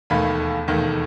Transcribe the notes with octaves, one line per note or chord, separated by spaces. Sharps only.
E1 D#2 D#3 A3 B5
E1 D#2 D#3 A3